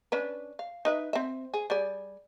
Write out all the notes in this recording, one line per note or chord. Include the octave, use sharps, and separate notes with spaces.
C#4 D4 B4
F5
D#4 B4 E5
C4 E5
G#4
G3 G#4 D5